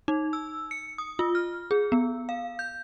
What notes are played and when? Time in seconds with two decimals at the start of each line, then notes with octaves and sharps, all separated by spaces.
0.08 D#4
0.33 E6
0.71 C#7
0.98 D#6
1.19 F4
1.35 F6
1.71 G#4
1.92 B3
2.29 F5
2.59 G6